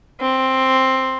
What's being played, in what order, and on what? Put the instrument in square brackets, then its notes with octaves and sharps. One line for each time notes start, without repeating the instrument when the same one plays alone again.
[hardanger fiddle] C4